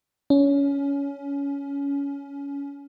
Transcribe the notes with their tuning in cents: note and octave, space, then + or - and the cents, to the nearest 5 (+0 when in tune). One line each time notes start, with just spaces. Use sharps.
C#4 +20